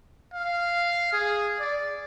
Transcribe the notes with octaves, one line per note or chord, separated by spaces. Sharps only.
F5
G#4
D5